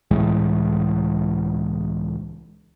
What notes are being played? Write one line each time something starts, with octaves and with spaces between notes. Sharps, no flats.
C#2 A2 E3 G#3